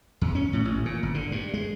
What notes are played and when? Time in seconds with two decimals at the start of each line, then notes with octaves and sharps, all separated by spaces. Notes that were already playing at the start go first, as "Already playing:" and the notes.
0.21 E2
0.35 C#4
0.53 A2
0.65 A1
0.85 A#2
1.03 G1
1.15 D3
1.32 G2
1.54 G#3